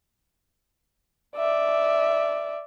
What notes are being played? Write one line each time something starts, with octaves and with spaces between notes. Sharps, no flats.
D5 E5